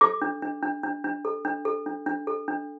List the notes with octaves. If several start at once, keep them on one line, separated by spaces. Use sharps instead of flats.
A4 D6
D4
D4
D4
D4
D4
A4
D4
A4
D4
D4
A4
D4